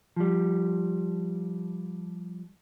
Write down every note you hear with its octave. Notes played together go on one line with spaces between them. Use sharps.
F3 G3